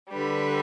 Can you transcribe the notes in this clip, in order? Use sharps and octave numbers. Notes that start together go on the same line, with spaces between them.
D3 G3 B4